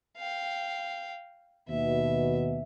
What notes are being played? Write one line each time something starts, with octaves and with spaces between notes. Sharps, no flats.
F5 G5
D#2 B2 E5